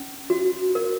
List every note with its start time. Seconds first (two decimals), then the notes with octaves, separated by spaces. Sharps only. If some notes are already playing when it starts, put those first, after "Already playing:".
Already playing: C#4
0.30 F#4
0.75 A#4